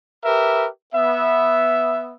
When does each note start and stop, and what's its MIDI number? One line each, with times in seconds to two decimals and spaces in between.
0.25 0.68 67
0.25 0.68 70
0.25 0.68 71
0.25 0.68 76
0.95 2.15 59
0.95 2.15 76